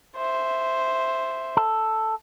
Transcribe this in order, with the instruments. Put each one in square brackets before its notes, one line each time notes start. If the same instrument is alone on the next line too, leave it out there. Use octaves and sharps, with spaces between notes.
[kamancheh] C5 E5
[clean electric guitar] A4